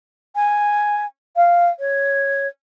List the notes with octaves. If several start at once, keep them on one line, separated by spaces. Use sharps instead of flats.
G#5
F5
C#5